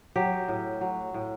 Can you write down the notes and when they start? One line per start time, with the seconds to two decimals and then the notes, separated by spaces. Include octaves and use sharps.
0.16 F#3 G4
0.48 A2
0.81 F#3
1.14 A2